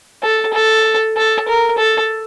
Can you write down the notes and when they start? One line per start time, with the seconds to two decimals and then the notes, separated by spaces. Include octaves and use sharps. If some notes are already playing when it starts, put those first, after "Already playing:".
0.23 A4
0.53 A4
1.17 A4
1.48 A#4
1.78 A4